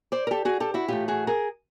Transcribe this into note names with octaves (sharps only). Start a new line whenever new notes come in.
C5 D5
A#4
G4 A4
F#4 G#4
G4 A4
E4 F#4
A2 E3 A3 F4 G4
F#4 G#4
G#4 A#4